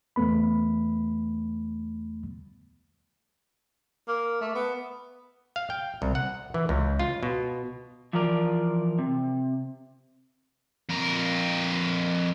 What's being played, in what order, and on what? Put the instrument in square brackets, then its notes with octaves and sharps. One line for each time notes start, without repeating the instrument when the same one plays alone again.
[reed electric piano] E2 A3 B3 B5
[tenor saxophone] A#3
A3
B3
[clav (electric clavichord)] F5
G5
C2
F#5
E3
C#2
F4
B2
[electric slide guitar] E3 F3 F4 A#4 D5
C3
[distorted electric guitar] F2 A#4